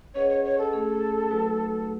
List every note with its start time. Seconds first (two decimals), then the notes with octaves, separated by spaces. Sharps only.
0.15 C#4 G#4 B4 C#5 D#5 F#5
0.30 C#5
0.44 C#5
0.58 A4
0.73 A3 C#4 G#4
1.31 F#3 A3 D#4 F#4 B4